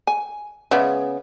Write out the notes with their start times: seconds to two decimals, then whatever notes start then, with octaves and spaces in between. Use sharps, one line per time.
0.07 G#5
0.71 C#3 G#3 B3 D5 E5